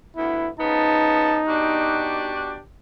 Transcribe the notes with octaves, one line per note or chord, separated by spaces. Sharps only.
D2 B3 E4
C#3 F3 B3 D#4 A5
B2 D4 F#4 G4